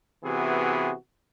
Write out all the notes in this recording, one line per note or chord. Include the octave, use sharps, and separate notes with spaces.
C3 E3 B3 F#4 G#4